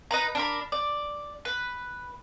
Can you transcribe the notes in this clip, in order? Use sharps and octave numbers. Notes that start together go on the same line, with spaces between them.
D#4 B4 A#5
D4 A#4 B5
D5
B4